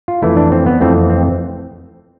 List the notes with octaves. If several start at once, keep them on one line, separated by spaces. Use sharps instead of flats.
F4
F2 E3 A3 E4
D4
C4
B3
F2 E3 A3 C4
C4